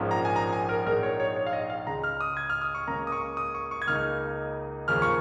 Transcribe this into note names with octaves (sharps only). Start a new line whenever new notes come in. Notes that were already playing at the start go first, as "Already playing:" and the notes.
Already playing: A#1 G#2 F3 A#3 C#4
A#5
G#5
A#5
G#5
A#4
A#1 G#2 G#3 D#4 A#4
C#5
C#5
C#5
F5
D#5
F5
C#2 C#3 G#3 C#4 A#5
F6
D#6
G#6
F6
D#6
C#6
C#2 C#3 A#3 C#4 A#5
D#6
C#6
D#6
C#6
C#6
G#6
C#2 C#3 A#3 D#4 F6
D#2 C#3 F3 A#3 C#4 F6
C#6